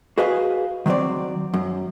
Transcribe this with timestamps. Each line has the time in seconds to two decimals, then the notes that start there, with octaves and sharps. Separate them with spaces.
0.18 F#4 G#4 B4 D#5 F5 G#5
0.86 D#3 F#3 A#3 C4 D5
1.54 F#2